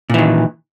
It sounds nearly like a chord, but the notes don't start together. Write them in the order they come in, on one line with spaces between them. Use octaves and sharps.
A#2 E3 D#3